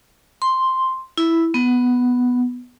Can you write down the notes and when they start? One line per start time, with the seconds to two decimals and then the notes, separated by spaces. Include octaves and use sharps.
0.42 C6
1.17 E4
1.54 B3